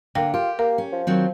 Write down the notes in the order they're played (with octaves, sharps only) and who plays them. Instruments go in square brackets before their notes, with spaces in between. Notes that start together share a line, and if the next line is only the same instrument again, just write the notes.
[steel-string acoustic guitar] D3 [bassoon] A#3 [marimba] A#4 G5
[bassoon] F4 [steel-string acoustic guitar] G4
[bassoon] A#3 [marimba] A#4
[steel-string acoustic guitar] C#4
[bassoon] F3
[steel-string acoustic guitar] D#3 F#3 C4